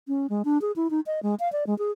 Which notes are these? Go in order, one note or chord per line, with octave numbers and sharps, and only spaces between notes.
C#4
G#3
D4
G#4
E4
D#4
D#5
G#3
F5
D5
G#3
G#4